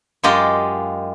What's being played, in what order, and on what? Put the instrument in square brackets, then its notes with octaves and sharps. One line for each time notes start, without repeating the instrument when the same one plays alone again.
[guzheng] F#2 G#3 F4 G4 D#5